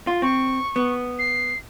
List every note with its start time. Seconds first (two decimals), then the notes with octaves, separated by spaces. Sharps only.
0.07 F4
0.22 C4 C#6
0.76 B3
1.19 C7